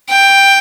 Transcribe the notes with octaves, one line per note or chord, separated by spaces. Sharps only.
G5